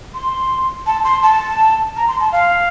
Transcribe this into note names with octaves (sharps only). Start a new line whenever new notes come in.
C6
A5
C6
A5
A#5
C6
A5
F5